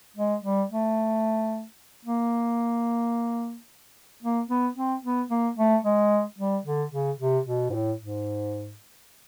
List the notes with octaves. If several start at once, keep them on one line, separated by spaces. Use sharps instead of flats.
G#3
G3
A3
A#3
A#3
B3
C4
B3
A#3
A3
G#3
G3
D3
C#3
C3
B2
G#2
A2
G#2